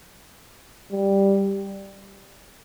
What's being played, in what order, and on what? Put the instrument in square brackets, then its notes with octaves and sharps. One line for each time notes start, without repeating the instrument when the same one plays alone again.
[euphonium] G3